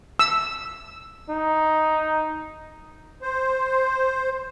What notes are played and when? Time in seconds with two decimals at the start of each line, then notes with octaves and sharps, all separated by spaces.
0.19 E6
1.30 D#4
3.22 C5